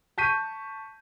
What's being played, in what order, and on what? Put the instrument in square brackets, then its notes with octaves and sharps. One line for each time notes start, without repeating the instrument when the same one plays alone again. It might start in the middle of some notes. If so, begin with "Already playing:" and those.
[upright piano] A5 C#6 G6 B6 D#7